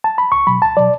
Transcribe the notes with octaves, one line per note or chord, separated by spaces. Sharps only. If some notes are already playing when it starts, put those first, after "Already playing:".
A5
B5
C#2 C#6
B2 F#3 B5
C#2 A5
B2 F#3 D5